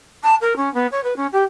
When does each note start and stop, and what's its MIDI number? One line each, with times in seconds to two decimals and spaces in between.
0.24 0.35 81
0.41 0.53 70
0.57 0.72 61
0.74 0.87 59
0.92 1.00 73
1.04 1.16 71
1.17 1.27 61
1.33 1.43 67